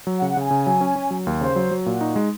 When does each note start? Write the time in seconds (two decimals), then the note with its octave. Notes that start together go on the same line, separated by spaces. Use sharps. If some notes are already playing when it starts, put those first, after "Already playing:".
0.07 F#3
0.17 F#5
0.22 C#3
0.29 F#5
0.37 C#3 G#5
0.51 C#3
0.66 F#3
0.81 C#4
0.96 C#4
1.11 F#3
1.27 D#2
1.41 C#3 C5
1.56 F#3
1.71 F#3
1.86 A#2 F#4
2.01 D#4
2.16 G#3